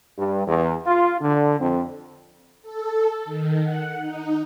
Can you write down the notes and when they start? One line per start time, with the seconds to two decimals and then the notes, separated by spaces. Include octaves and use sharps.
0.17 G2
0.46 E2
0.84 F4
1.21 D3
1.60 F2
2.62 A4
3.25 D#3
3.63 F#5
4.01 D#4